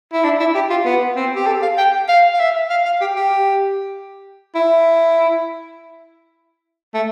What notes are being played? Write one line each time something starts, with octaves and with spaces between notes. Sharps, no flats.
E4
D4
E4
G4
F4
B3
C4
G4
A4
F5
G5
F5
F5
E5
F5
F5
G4
G4
E4
A3